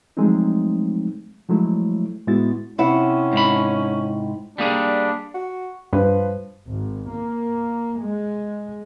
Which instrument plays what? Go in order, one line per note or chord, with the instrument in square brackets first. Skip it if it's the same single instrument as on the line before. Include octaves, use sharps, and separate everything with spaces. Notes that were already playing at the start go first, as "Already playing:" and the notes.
[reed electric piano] F3 F#3 G#3 A3 C4 D#4
F3 F#3 G#3 A3 E4
A2 G#3 B3 E4 F#4 A6
[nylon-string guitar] C3 E4 F#5 [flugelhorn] C#4
[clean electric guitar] G#2 B5
[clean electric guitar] G3 A#3 G#4 [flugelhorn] D4
[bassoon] F#4
[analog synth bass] G2 [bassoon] F3 [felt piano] B4
[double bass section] G#1
A#3
G#3